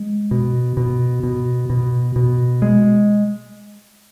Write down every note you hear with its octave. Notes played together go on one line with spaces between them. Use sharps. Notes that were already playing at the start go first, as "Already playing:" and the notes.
Already playing: G#3
B2
B2
B2
B2
B2
G#3